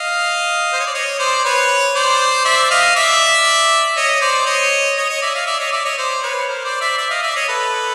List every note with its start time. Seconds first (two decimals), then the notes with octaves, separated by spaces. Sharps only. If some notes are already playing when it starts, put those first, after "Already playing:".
Already playing: D#5 F5
0.73 C5
0.80 C#5
0.86 D5
0.94 C#5 D#5
1.19 C5 D5
1.45 B4 C#5
1.95 C5 D5
2.45 D5 E5
2.71 D#5 F5
2.96 D5 E5
3.97 C#5 D#5
4.21 C5 D5
4.46 C#5 D#5
4.97 C#5 D#5
5.10 C#5 D#5
5.22 D5 E5
5.35 D#5 F5
5.47 D5 E5
5.60 C#5 D#5
5.72 D5 E5
5.85 C#5 D#5
5.98 C5 D5
6.22 B4 C#5
6.48 A#4 C5
6.64 C5 D5
6.81 D5 E5
6.98 D5 E5
7.11 D#5 F5
7.23 D5 E5
7.35 C#5 D#5
7.48 A4 B4